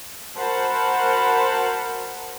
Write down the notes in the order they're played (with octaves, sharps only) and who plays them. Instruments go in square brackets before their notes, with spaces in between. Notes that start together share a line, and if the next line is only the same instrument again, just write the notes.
[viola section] F#4 A#4 C5 F#5 A5 B5